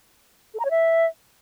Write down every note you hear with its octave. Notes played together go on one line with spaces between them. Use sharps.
A4
A#5
C#5
E5